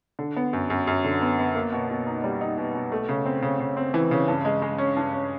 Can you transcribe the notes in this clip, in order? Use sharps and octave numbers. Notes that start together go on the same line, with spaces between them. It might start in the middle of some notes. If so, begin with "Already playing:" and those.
D3
B3
F#2
F#2
F#2
D3
B3
B3
A#3
B2
B2
D#4
G3
D#4
B2
B2
A3
C#3
C4
C#3
C#3
C4
E3
C#3
G2
G#3
G#3
C#4
G2
C#4